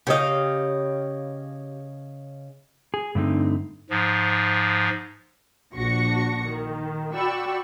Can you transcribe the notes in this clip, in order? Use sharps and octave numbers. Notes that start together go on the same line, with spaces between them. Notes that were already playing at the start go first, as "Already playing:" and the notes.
C#3 G4 C#5 D#5 F5
G#4
G2 D3 A3 C4 D#4
G#2 F3
A#1 D4 F#4 C#6 A#6 C#7
D#3
F#4 D5 G5 B5 C#6 E6